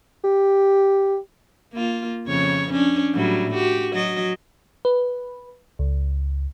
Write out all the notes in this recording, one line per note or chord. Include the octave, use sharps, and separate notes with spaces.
G4
A#3 F4
F2 C#3 C#5
C#4 D4
A2 F#3 G3
F#4 G4
F#3 D#5
B4
C#2